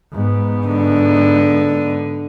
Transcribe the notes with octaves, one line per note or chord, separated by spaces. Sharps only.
G#2 B3
D3